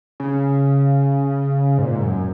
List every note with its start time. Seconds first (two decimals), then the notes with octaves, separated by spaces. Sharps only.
0.20 C#3
1.78 G#2
1.83 A#2
1.95 G#2
2.03 F#2